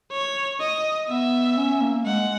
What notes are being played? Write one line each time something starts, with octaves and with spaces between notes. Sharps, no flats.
C#5
D#5
B3 E5
C#4
A#3
G#3 F#5